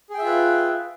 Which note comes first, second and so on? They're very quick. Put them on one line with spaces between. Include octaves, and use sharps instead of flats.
G#4 G5 E5 F4 B4